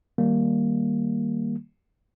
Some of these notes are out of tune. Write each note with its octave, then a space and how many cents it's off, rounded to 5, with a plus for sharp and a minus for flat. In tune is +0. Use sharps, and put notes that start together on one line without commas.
D#3 +0 G3 +0 A#3 +0